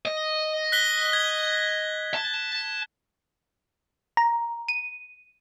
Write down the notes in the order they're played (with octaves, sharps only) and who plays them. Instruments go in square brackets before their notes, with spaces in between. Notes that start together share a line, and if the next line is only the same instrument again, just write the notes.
[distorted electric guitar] D#5
[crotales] F#6 B6 G7
G#6
[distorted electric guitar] A5
[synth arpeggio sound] A#5
D#7